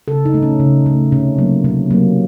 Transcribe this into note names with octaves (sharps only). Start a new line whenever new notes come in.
C#3 A4
D#4
A3
C#4
C#3
A3
C3 C#4
F#3 A#3
C3
F#3 A#3